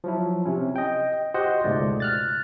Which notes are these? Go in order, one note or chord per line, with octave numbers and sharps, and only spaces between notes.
F3 F#3 E4
C3 C#4
D#5 G5
F#4 G4 C5 D#5 F#5
C#2 G#2 B2 A3 D5
F6 F#6 A6